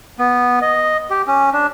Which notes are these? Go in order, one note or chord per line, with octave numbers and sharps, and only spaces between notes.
B3
D#5
G4
C#4
D4